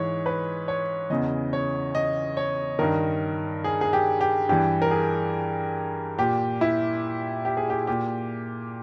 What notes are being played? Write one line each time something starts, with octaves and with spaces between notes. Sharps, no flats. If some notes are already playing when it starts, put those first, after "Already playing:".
Already playing: G#2 E3 C#5
B4
C#5
E2 C#3 E3 D#5
C#5
D#5
C#5
G2 D#3 A#4
G#4
G#4
G4
G4
G2 E3 G4
A#4
G#4
A#2 G4
E4
G4
G#4
G4
A#2 G4